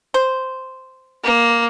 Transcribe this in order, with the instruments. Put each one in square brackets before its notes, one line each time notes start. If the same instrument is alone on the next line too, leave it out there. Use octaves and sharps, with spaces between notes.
[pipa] C5
[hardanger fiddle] A#3